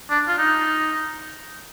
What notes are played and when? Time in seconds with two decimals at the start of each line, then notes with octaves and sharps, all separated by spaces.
0.10 D4
0.28 F4
0.38 D#4